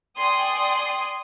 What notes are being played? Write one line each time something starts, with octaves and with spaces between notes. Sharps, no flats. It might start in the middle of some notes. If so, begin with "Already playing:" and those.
D5 G5 G#5 C6 D#6